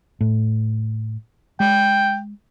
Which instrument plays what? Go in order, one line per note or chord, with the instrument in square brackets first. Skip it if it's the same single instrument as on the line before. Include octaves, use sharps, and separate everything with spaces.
[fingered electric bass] A2
[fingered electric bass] G#3 [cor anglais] G5